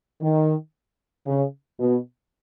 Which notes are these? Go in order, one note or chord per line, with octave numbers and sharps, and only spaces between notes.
D#3
C#3
B2